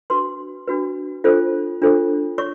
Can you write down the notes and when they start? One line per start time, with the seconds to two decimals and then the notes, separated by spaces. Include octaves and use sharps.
0.10 D4 F#4 B4 C6
0.68 D4 F#4 B4
1.24 D4 F4 A4 C5
1.82 D4 F4 A4 C5
2.38 C#5 C#6